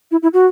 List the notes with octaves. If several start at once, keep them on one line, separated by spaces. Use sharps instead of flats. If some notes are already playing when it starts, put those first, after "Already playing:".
E4
E4
F#4